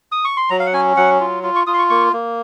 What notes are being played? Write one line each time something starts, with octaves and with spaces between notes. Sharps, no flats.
D#6
C#6
C6
F#3 A#5
F5
F#5
C#4 G#5
F#3 F#5
F4
F4
C#6
F4 D#6
C6
C#6
A#3 C#6
A#3